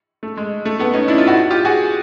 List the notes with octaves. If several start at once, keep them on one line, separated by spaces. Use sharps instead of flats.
A3
G#3
A3
A3 B3
C#4 D#4
D4 E4
D#4 F4
E4 F#4
F4 G4
F#4 G#4